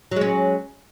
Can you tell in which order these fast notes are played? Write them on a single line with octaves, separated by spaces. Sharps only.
F#3 G#3 C#4